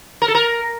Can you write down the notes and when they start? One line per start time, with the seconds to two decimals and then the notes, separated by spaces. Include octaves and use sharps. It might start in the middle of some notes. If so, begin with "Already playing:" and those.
0.22 A#4
0.28 A4
0.35 A#4